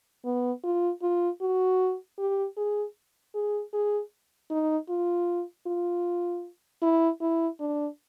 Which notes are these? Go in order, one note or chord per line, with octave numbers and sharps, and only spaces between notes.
B3
F4
F4
F#4
G4
G#4
G#4
G#4
D#4
F4
F4
E4
E4
D4